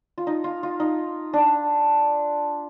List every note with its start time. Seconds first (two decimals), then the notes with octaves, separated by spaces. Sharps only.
0.18 F4
0.27 D#4
0.44 F4
0.63 F4
0.80 D#4
1.33 D4